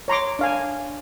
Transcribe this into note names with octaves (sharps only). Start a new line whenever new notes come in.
C#5 A#5 C6 D6
D4 F5 G#5